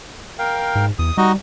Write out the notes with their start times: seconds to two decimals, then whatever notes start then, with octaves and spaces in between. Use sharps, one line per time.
0.39 A#4 F5 G5
0.75 G#2
0.99 E2 D#6
1.17 G3 D#4 F#4 D#5